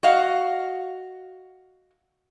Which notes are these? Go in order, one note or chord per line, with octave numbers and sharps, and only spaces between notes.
F#4 D#5 F5 F#5